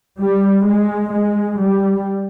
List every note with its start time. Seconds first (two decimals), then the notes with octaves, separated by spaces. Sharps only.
0.19 G3
0.66 G#3
1.12 G#3
1.59 G3